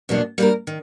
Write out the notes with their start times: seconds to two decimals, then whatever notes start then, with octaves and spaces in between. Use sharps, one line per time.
0.09 E2 B2 F#3 A#3 D4
0.38 G3 A#3 D4 F4 A#4
0.67 D#3